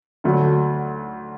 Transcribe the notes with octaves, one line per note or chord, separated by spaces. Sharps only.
D2 D3 F#3 A3